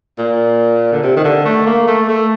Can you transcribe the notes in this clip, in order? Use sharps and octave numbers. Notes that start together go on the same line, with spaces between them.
A#2
D3
C3
D#3
D3
A3
A#3
A3
A3